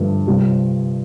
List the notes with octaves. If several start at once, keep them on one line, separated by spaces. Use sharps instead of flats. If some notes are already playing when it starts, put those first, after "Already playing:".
Already playing: G2 D3 F3 A3
C3 G3 F4